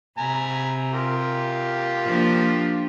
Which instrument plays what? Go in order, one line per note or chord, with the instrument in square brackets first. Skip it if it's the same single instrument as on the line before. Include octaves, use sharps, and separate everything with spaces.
[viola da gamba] C3 [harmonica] G#5 A#5 B5
[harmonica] F4 G4 A#4
[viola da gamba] F3 A#3 D4